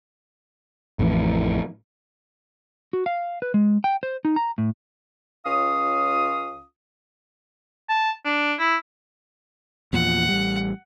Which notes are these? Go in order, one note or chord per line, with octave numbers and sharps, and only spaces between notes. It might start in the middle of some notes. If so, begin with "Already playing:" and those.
A1 F2 A2 E3
F#4
F5
B4
G#3
G5
C5
D#4
A#5
A2
C#2 C#4 F4 F5 D#6
A5
D4
E4
E2 A#2 F3 F#5
A1 G3